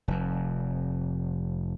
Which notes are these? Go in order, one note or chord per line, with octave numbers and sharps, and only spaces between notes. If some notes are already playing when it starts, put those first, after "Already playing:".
F1 F2